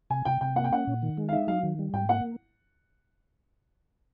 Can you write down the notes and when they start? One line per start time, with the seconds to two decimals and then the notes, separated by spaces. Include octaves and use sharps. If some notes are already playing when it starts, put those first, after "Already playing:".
0.10 C3 G#5
0.25 C3 G5
0.41 C3 G5
0.56 A#3 F#5
0.64 G5
0.72 C#4 F#5
0.87 A#2
1.02 D#3
1.17 G#3
1.29 F5
1.32 D#4 E5
1.47 F#3 F5
1.63 D#3
1.79 G3
1.93 G#2 G5
2.09 A#3 F#5